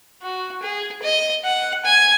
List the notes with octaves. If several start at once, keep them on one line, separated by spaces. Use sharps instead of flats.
F#4
G#4
D#5
F#5
G#5